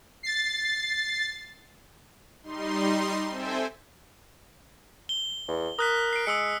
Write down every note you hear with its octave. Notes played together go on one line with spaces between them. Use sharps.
A6 C7
G3 D#4 C6
C4 A4 C5 E5 G5 G#5
G7
E2
A#4 D#6 F#6 B6
C7 D7
G#3 D#6 E6 C#7